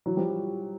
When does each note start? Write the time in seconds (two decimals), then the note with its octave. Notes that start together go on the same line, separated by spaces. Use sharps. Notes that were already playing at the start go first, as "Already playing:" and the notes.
0.06 E3 F#3
0.17 F3 G3